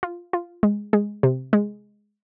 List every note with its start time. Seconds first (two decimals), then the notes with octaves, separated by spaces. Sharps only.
0.03 F4
0.33 F4
0.63 G#3
0.93 G#3
1.23 C3
1.53 G#3